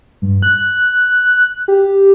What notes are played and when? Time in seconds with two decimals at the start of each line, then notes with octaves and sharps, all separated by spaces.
0.22 G2
0.42 F#6
1.68 G4